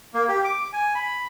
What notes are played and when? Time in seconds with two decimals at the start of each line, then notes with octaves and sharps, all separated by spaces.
0.14 A#3
0.29 G4
0.45 D6
0.73 G#5
0.95 B5